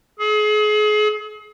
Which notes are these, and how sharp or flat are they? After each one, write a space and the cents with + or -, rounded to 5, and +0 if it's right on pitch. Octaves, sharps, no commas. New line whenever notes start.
G#4 +35